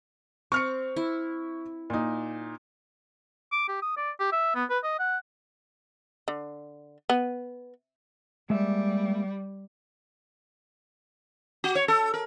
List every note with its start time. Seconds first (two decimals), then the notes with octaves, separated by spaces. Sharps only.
0.52 C4 C#6 F6 C#7
0.96 E4
1.90 A#2 D#4
3.52 D6
3.68 G4
3.82 D#6
3.97 D5
4.20 G4
4.32 E5
4.55 B3
4.70 B4
4.83 D#5
4.99 F#5
6.28 D3
7.10 B3
8.50 G3 G#3 A#3 E5
11.64 F#4
11.75 C#5
11.88 A4
12.14 A#4